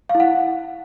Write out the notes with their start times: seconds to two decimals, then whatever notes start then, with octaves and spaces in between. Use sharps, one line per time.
0.09 F5
0.15 E4
0.20 F#5